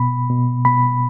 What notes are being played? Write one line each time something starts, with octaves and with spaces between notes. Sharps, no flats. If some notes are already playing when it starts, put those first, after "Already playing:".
Already playing: B2 B5
B2
B2 B5